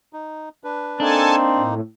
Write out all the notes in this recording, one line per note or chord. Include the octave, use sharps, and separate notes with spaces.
D#4
D4 B4
A#3 C4 D4 D#4 A4 G#5 A5
A2